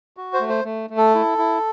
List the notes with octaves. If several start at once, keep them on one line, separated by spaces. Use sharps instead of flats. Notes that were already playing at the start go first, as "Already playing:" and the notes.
F#4
C5
A3
C5
A3
A3
A4
E4
E4